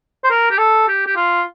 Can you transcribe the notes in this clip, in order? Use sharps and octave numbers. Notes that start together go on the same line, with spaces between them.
C5
A#4
G4
A4
G4
G4
F4